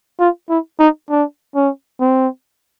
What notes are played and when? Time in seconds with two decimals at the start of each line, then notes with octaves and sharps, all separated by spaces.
0.20 F4
0.50 E4
0.79 D#4
1.10 D4
1.55 C#4
2.01 C4